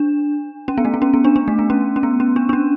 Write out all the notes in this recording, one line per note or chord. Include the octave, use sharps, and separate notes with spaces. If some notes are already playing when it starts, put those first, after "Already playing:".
Already playing: D4
C#4
B3
A3
B3
C#4
B3
D4
D4
A3
B3
C#4
C#4
B3
C#4
D4
D4
C#4